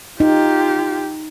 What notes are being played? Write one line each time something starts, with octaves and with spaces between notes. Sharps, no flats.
D#4 F4 G4